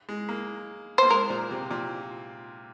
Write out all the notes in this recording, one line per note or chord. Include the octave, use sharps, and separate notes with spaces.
G#3
A#3
A#3 C5
G#3 A#4
A#2
C3
A#2